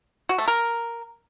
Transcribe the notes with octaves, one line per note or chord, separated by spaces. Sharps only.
F#4
A3
A#4